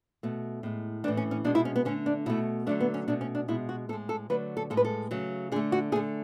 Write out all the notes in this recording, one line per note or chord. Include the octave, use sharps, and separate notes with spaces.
B2 A3
A2 G#3
A2 E3 A3 D4
C#4
C#4
B2 G#3 D4
E4
C#4
B3
D3 A3 C#4
D4
B2 A3 E4
D3 F#3 A3 D4
B3
C#4
B2 A3 D4
C#4
D4
B2 G#3 E4
F#4
A2 G#3 A4
A4
D3 F#3 A3 B4
A4
A2 G#3 A4
B4
A4
C#3 F#3 A3
D3 A3 G#4
F#4
D3 A3 G#4